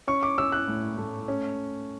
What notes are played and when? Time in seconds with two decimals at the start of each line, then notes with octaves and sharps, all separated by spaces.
0.07 C#4 C#6
0.23 D6
0.38 C#4 E6
0.52 F#6
0.68 A2
0.98 A3
1.28 C#4